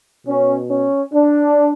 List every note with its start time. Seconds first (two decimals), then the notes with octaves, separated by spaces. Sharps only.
0.24 B2 C#4
0.68 C#4
1.13 D4